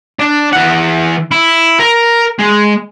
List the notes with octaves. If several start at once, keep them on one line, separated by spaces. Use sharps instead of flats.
D4
E3 F#5
E4
A#4
G#3